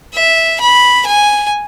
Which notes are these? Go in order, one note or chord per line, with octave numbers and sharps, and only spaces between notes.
E5
B5
G#5